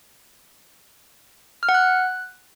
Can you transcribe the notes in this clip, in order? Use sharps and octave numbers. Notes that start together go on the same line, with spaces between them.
F6
F#5
F#6